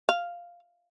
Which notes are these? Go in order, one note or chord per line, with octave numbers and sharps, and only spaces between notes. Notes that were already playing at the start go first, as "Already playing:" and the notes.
F5